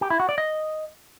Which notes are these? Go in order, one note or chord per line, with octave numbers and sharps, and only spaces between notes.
G4
E4
F#4
D5
D#5